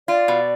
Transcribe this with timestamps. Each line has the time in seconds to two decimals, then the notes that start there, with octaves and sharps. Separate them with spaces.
0.08 F4 D5
0.28 B2